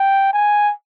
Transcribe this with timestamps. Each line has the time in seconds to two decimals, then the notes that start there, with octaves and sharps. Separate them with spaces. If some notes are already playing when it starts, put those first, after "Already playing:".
Already playing: G5
0.33 G#5